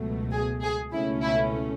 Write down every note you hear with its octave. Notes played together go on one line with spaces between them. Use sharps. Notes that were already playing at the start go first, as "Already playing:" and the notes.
Already playing: C#2 B2 F#3 A3
G#4
G#4
C#2 B2 A3 C#4 E4
E4